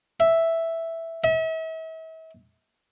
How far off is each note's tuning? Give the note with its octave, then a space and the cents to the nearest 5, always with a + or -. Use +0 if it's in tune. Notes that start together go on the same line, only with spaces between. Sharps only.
E5 +0
E5 -40